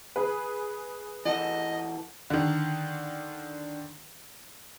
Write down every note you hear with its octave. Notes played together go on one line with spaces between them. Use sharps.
G#4 B4
E3 F#4 A4 D#5
D3 D#3